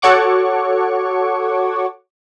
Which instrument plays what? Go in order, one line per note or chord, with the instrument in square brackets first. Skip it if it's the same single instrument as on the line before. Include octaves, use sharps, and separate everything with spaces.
[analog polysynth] F#4 A4 C#5 F#5 C#6 D6